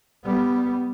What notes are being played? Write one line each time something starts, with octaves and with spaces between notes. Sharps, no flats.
G3 B3